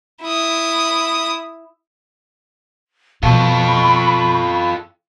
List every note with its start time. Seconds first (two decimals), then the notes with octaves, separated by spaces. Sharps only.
0.22 E4 D#6
3.23 B2 F3 F4 A4 B5 C#6